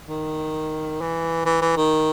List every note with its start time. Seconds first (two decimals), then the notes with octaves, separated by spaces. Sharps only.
0.09 D#3
1.01 E3
1.46 E3
1.62 E3
1.77 D#3